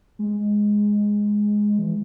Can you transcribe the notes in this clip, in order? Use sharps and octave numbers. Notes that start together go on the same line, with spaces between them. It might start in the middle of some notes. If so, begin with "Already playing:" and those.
G#3
E3